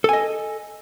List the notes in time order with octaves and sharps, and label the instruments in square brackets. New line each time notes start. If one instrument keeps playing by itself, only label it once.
[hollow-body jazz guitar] A4
G#5
D#5